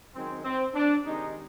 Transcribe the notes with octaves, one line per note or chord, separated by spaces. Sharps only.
F#2 D#3 G#3 C4
C4
D4
C3 D#3 G#3 D#4